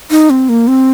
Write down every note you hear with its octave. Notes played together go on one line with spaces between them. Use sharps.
D#4
C4
A#3
C4